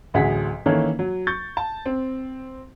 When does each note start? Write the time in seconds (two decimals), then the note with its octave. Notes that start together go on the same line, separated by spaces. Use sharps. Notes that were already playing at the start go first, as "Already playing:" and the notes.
0.14 A1 D2 F#3 G#4 F#5 B6
0.66 D#3 E3 A#3 C#4 A4 C#5
0.99 F#3
1.27 C#6 G6 A6
1.57 A5
1.86 C4